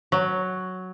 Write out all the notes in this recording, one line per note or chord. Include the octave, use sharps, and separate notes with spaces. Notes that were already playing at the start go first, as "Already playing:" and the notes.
F#3